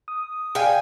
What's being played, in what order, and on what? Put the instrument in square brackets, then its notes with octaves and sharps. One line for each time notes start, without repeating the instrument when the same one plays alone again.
[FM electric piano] D#6
[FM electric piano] G#4 D5 F5 [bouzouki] G5 G#5